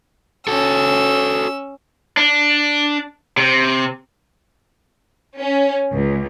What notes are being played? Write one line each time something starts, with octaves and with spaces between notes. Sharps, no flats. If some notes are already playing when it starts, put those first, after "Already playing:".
C#4 F#4 A4 E6
D4
C3
C#4
C#2